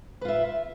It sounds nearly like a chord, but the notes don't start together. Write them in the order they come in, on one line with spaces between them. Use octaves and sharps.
B4 F4 E5